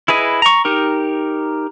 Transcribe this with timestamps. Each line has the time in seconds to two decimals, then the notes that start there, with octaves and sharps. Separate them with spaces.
0.08 E4 G#4 B4 D#5
0.42 A#5 C#6
0.65 D#4 G4 A#4